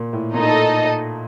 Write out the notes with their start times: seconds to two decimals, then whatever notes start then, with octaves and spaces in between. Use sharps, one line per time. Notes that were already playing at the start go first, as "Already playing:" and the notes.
Already playing: A#2
0.13 A2
0.33 A#2 D#4 A4 D#5